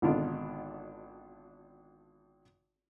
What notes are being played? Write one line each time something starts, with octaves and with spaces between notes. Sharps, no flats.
G#1 B2 D3 D#3 D4 F4